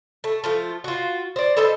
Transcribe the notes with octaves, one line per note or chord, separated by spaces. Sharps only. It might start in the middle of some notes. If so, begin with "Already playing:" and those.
A3
F3 A3 F4
F4 F#4
C5 D5
A4 B4 C5 D#5